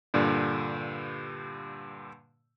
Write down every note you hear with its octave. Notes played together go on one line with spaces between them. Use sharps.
G2 A#2 D3